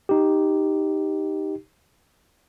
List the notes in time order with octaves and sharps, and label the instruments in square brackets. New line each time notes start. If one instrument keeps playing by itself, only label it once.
[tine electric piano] D#4 G4